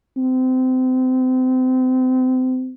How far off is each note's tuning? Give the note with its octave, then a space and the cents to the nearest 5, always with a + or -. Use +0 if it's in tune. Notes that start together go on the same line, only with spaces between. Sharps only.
C4 -30